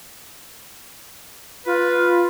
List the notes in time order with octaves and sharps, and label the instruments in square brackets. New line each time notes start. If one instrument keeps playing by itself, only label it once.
[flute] F4 [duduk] B4